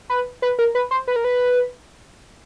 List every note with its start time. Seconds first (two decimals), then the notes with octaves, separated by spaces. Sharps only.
0.10 B4
0.42 B4
0.59 A#4
0.75 B4
0.91 C5
1.08 B4
1.16 A#4
1.24 B4